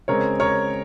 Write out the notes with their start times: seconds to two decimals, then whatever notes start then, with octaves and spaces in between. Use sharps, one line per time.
0.08 C#3 G#3 C4 A#4 C#5
0.40 A#4 C#5